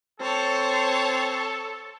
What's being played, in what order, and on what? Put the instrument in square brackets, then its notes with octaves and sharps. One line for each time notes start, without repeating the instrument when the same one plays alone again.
[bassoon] C4 [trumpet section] A4 [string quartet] C5 C#5 A5